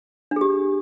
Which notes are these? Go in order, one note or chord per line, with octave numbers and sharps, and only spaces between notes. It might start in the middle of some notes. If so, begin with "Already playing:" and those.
D4 G4 G#4